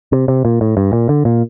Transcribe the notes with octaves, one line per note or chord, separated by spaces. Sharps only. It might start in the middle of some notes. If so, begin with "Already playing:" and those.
C3
C3
A#2
A2
G2
A#2
D3
A#2